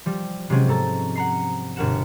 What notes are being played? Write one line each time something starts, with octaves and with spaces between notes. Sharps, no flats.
F3 G3
C3 F3 F#3 G#3 C4 C#4
G#2 A4 A#5 A6
F#5 A#5 C7
G1 B2 A#4 F#5 E7